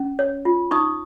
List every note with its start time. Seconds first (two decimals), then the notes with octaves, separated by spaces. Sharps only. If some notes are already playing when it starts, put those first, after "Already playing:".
Already playing: C#4
0.19 C#5
0.45 F4
0.71 D#4 C#6 D#6